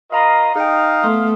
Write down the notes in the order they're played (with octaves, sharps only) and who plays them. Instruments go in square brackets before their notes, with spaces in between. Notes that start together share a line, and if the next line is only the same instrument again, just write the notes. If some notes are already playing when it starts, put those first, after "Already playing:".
[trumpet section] F4 A#4 D#5 [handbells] F5 A#5 B5
[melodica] D#4 [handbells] G#4 G5 [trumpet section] F5
[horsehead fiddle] A3 [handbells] B3 C6 D#6